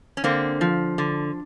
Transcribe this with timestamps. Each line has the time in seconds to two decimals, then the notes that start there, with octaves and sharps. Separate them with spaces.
0.17 C#4
0.24 D3 A#3 C4
0.61 F3
0.98 D3